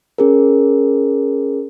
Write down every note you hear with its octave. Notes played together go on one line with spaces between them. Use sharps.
C#4 G#4 A#4